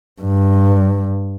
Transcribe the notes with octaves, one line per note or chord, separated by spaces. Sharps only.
G2